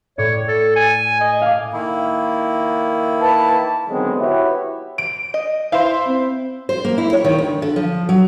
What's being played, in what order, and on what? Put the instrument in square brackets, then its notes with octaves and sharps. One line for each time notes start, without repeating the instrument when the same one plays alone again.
[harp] A2 D5 [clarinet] C#5
[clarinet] A4
G#5
D#5
[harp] F5 G#5 D6
[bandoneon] D#3 A#3 E4
[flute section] B4 A5
[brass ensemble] D3 D#3 F#3 G#3 B3 C4
E4 F#4 G4 B4 C#5 E5
[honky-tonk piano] D7
[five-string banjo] D#5
[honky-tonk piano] E4 C5 [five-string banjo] F5
[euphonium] C4
[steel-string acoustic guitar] C5
A#3
E4
C#5
D#3
D2
D3
F3
F#3